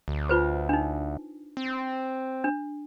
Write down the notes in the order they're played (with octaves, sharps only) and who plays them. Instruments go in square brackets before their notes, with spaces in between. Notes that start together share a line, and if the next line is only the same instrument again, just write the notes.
[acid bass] D2
[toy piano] F4 B4 C5
D4 D#4
[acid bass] C4
[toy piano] D4